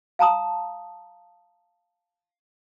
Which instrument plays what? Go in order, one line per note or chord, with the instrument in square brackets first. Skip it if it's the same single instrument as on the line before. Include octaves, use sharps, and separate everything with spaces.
[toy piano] F5 A5 A#5 D#6